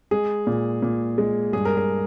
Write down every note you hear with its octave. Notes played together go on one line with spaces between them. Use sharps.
G#3 G#4
A#2
A#2
G#3
G2 G#4
A#4
G#4